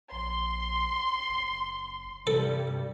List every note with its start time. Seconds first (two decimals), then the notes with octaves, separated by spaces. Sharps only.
0.12 A#1 C6
1.29 F#1
2.27 G2 C3 G3 A4